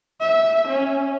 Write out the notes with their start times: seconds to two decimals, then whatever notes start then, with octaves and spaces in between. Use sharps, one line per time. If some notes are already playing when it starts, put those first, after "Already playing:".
0.21 E5
0.69 C#4